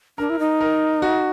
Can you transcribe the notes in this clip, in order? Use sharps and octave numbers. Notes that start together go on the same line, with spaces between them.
D4 A#4
E4
D#4
A#4
F#4